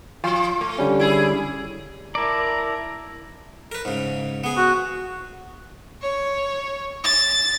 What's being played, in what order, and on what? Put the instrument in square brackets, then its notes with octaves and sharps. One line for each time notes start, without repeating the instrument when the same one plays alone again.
[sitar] F3 [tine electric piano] F4
[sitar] A3
[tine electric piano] D3 G3 C#4
[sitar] E4 G#4
[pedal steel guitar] E4 D5 [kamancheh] A#4 A5 [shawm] A#5
[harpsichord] A#4 B4
G#2 C#3
B3 G#4
[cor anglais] F#4
[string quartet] C#5
A6